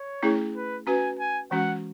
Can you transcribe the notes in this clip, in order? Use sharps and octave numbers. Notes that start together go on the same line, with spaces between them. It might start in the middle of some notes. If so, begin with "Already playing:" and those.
Already playing: C#5
A3 C#4 E4 G#4
B4
C#4 F#4 B4 G#5
G#5
E3 G#3 C#4 F#4 F#5